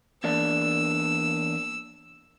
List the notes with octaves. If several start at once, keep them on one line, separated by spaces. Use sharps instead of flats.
E2 A#3 D4 E6